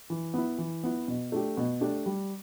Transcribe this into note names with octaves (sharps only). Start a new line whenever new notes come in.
E3
B3 E4
E3
B3 E4
B2
A3 D4 G4
B2
A3 D4 G4
G3